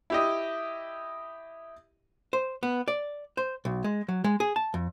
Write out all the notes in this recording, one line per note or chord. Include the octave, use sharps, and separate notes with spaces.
E4 G4 D#5
C5
B3
D5
C5
B1
G#3
F#3
G#3
G#4
A5
F2